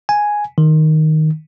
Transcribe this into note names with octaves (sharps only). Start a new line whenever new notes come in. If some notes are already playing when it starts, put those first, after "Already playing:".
G#5
D#3